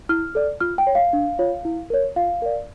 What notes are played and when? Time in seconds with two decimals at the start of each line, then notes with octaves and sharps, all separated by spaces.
0.09 E4 F6
0.35 A4 D5
0.60 F4 F6
0.78 G5
0.87 C#5
0.95 F5
1.13 D4
1.39 F4 C#5
1.65 E4
1.90 A#4 C#5
2.16 F4 F5
2.42 A#4 D5